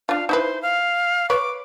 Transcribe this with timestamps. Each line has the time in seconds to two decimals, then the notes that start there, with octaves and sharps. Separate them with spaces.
0.09 D4 F4 F5
0.29 D#4 E4 B4 C5
0.62 F5
1.30 B4 C#5 D6